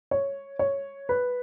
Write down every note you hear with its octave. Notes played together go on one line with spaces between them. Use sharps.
C#5
C#5
B4